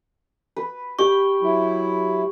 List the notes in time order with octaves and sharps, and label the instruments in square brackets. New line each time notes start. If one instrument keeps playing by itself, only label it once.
[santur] B4
[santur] G4 G5 [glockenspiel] C#6
[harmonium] F#3 E4